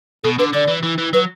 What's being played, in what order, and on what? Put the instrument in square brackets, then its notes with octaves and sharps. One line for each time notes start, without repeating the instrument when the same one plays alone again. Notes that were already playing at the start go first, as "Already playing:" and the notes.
[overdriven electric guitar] B2 [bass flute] A4
[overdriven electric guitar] D3 [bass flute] B4
[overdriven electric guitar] D3 [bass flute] D5
[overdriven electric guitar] E3
E3
E3
[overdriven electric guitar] F#3 [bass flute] B4